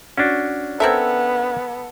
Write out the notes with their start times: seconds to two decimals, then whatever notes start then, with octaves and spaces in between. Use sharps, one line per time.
0.18 C#4 D4 F#4
0.80 B3 C4 A4 A#4 E5 G#6